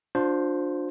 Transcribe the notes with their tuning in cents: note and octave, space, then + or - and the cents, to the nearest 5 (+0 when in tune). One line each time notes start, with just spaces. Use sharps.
D4 +0 F4 +35 C5 +0